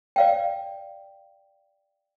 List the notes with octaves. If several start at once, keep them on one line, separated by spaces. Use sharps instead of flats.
D5 F5 G5